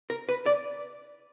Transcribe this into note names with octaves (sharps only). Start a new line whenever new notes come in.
A#4
B4
D5